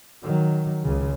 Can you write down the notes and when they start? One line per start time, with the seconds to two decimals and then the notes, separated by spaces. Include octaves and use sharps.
0.23 D#3 F#3
0.84 C#2 C#3